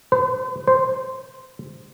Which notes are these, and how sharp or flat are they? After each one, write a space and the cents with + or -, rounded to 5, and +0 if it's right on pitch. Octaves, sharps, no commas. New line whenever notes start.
C5 -45
C5 -10